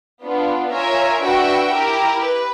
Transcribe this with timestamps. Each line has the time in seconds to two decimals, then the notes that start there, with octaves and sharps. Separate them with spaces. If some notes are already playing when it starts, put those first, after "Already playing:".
0.25 B3 D4 F4
0.74 F4 A#4 C#5 E5 G#5
1.24 D4 F#4 B4 E5 G5
1.73 E4 G4 A#4
2.24 B4